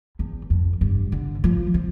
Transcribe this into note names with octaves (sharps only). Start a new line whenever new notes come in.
E2
F2
G2
D3
F3
F3